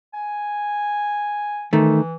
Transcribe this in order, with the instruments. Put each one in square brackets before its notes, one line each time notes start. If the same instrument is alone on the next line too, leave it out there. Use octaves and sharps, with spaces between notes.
[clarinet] G#5
[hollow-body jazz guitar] D#3 A3 [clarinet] E3